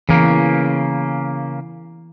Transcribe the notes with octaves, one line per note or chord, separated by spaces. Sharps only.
C#3 E3 A#3